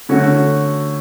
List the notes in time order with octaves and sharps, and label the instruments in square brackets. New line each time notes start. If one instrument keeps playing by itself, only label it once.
[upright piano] D3 A3 C#4 F#4